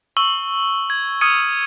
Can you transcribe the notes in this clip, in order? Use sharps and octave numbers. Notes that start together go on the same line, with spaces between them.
C#6 E6 F#7 G7
G#6
D#6 F6 G#6 C#7 D#7